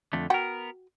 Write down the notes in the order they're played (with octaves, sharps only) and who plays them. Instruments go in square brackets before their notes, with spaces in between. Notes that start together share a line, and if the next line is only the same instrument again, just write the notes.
[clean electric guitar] F2 D3 A3
[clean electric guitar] B3 A#4 [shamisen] F#4 F#5 G5